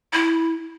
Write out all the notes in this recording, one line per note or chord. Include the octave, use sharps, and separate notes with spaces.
E4